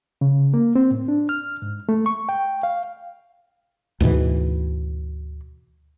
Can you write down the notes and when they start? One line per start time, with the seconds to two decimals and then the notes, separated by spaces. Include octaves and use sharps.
0.21 C#3
0.54 A#3
0.75 C4
0.91 A2
1.08 D4
1.29 F6
1.62 G#2
1.89 A3
2.06 C#6
2.29 G5
2.63 F5
4.00 D2 G#2 B2 E3